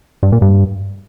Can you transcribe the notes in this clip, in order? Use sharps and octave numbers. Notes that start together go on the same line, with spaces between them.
G2
A#2
G2